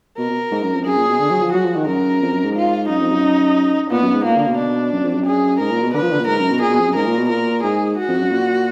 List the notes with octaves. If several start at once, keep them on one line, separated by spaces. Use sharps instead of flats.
B2 A#4
B2
G#2
F#2
F2
F#2 G#4
A#2
B2
D3
F#3
F3
F#3 F#4
F3
D#3
F#2 A#4
F2
F#2
G#2
F4
F#2 D#4
F2
F#2
A#2 B3
F#2
G#2
A#2 A#3
D3
B2
D4
F#2
F2
F#2
G#4
G#2 A#4
A#2
B2
D3 B4
F3
D3
A#2
G#2 A#4
F#2
B2
A#2 G#4
B2
F2
F#2
G#2 A#4
A#2
B2
A#2 A#4
G#2 G#4
F#4
F2
F#2
A#2